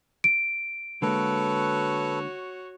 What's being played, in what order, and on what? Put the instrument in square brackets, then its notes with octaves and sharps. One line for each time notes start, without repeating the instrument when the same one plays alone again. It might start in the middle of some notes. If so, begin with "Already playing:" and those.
[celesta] D7
[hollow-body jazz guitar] D3 G#3 A#3 [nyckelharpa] F#4 C#5 [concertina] A4 B4